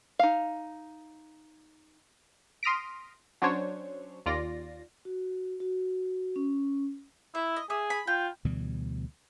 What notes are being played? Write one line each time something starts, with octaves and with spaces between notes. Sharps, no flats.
D#4 F5
C6 D#6 F6 A#6 B6 D7
F#3 C#4 D4 C5 C#5
D#2 F4 D5 A#6
F#4
F#4
C#4
E4 E5
D#5
G#4 E5 D#6
B5
F4 G5
D2 B2 E3 G3